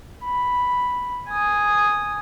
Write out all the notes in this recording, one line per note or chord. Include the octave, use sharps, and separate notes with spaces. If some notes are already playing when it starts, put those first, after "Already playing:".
B5
G#5 D#6